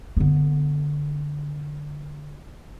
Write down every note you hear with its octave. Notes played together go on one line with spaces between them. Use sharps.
D3 B3